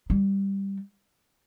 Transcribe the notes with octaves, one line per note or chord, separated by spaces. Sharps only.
G3